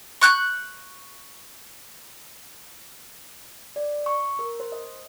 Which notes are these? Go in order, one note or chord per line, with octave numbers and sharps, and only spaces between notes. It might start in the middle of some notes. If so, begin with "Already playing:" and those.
C#6 F#6 G6
D5
C#6
A#4
C5
D#5